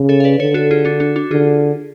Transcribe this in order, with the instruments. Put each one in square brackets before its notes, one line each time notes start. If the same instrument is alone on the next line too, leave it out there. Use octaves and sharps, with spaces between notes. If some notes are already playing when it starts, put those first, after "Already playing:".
Already playing: [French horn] C#3
[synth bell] A4 C#5
F5
B4 D5
[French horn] D3 [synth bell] A4 C#5
[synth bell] F#4 A4
F4 G#4
D4 F#4
D4 F#4
D4 F#4
[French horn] D3 [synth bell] F4 G#4